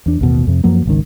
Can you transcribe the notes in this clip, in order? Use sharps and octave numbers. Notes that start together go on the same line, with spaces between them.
E2 D4
A1 D#2 B2
F2 C3
F#2 F3 F#3 A#3
G#1 C#2 D#3